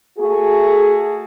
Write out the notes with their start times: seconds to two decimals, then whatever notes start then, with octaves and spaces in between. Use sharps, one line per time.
0.18 A3 F#4 G#4